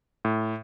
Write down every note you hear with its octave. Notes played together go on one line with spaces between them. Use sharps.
A2